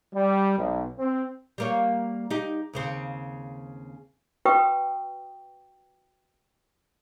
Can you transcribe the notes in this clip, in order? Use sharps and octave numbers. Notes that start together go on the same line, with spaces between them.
G3
B1
C4
G3 A#3 C#5
D#4 G4
D#2 C#3 C4
F#4 B4 G5 C#6 D#6